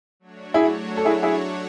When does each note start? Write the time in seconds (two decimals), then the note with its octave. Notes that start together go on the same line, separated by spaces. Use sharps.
0.20 F#3 A3 D4 F#4 C#5
0.54 E4 G#4
0.97 A4
1.05 E4 G#4
1.23 E4 G#4